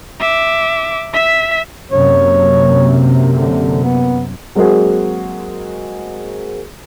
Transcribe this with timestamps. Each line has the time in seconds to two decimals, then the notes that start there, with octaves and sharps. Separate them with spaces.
0.20 E5 D6
1.14 E5 B6
1.92 F#2 C3 A#3 C#5
3.32 D3
3.84 B3
4.55 F#3 G#3 A#3 C4 F#4 G#4